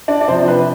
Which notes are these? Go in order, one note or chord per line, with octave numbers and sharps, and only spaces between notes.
D4 D5
D5
C3 F3 C5
B4